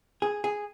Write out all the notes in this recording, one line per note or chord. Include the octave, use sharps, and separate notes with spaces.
G#4
G#4